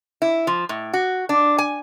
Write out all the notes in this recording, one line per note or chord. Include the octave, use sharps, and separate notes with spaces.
E4
F3
A2
F#4
D4
G#5